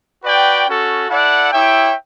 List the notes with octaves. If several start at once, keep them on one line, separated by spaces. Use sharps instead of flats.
F#4 B4 D5 G5
C#4 F#4 A4
E4 A4 D5 F#5
E4 G4 C#5 E5 G5